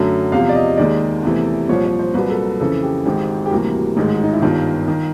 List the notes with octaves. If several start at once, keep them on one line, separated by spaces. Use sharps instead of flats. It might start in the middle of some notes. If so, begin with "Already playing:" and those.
Already playing: F#2 D3 F#3 A3
E2 C3 F3 F5
D5
D#5
D#2 D#3 G#3 D5
E2 C3 E3 A3
C2 A#2 F3 C#5
C#5
C5
C2 A#2 F#3 A#3 B4
A4
F2 C#3 E3 A4
G4
G#1 G#2 D#3 G#3 G4
G4
D2 C3 E3 G3 A#3 F#4
A1 G#2 D#3 G#3
D#4
E4
G1 G2 D#3 F4
D#3